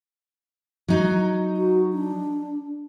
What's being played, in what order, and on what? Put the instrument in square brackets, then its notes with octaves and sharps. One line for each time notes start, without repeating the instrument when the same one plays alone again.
[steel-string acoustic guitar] F#3 D#4
[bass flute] F#4
D4